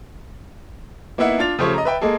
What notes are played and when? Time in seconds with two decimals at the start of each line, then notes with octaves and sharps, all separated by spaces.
1.18 A#3 B3 D#4 E4 E5 F#5
1.39 D4 F4 A6 F7
1.59 C#3 F3 A3 G4 C5 C#5
1.74 D#5 A#5
1.85 B4 E5 G5
2.01 G#3 A#3 G#4 A4